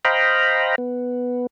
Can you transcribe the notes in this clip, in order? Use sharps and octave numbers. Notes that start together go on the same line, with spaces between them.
C5 D#5 F5 G5 A#5 B5
B3